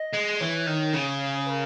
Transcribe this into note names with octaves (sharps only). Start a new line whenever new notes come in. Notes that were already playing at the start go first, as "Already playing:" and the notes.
Already playing: D#5
G#3
E3 C#5
D#3
C#3
B4
A#4